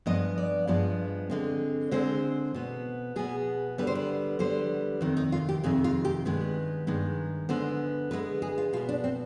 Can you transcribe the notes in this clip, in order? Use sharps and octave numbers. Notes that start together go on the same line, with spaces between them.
G2 F3 G#3 B3 D#5
D5
G2 F3 G#3 B3
D3 G#3 C4
D3 G#3 C4 C5
B2 B3
B2 B3 G#4
D3 G3 B3 B4
C5
B4
D3 G3 B3 C5
F2 C3 D#3
D#4
F4
G4
F2 C3 D#3 G#4
F4
G4
G2 D#3 G#3 B3 B4
G2 D#3 G#3 B3
D3 G#3 B3 C5
D3 G#3 B3 B4
G#4
F4
B2 B3 F4
D4
C4